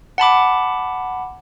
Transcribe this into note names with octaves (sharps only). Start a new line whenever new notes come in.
F#5 A5 B5 D6